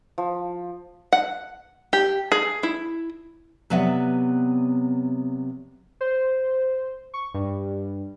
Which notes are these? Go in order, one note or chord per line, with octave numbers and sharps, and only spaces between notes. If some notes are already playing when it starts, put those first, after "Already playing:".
F3
F#5
G4
G#4
E4
C3 F#3 B3 D5 E5 F#5
C5
C#6
G2